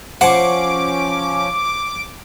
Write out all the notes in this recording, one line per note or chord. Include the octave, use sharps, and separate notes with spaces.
F3 C#4 C5 F#5 G#5 D6